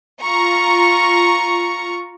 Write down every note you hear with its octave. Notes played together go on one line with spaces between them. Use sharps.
F4 A#5 C#6